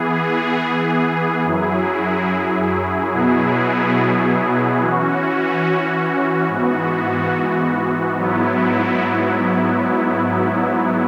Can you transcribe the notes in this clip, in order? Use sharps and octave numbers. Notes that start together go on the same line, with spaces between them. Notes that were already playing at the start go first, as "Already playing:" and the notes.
Already playing: E3 B3 G#4
F#2 F#3 E4 G#4
B2 F#3 B3 E4 G#4
E3 C#4 F#4
G#2 E3 B3 F#4
G#2 F#3 B3 E4